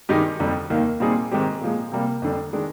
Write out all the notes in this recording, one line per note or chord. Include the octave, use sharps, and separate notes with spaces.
G2 D#3 G#3 D#4 G4
F2 D3 G3
D#2 D#3 A#3
A#2 G3 C4 D#4 G#4
G#2 D#3 G#3 C4 G4
A#2 F3 G#3
C3 G3 A#3
F2 D3 G3
D#3 G#3 D4